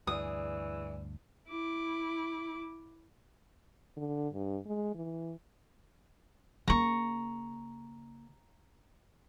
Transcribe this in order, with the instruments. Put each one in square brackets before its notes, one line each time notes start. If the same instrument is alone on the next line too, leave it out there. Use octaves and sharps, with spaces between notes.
[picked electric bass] D2 G2 [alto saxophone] E3 [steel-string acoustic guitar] G#4 D5 [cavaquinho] D#6
[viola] E4 D6
[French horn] D3
G2
G#3
E3
[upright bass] C#3 A#3 [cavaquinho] A#5 C#6